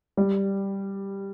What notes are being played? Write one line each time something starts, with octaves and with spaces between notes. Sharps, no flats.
G3